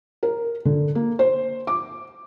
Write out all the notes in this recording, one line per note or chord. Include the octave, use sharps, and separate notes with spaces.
A#4
D3
A#3
C5
D6